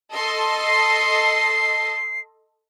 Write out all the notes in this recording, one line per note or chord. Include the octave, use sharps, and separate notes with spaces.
A4 D#5 C6
C7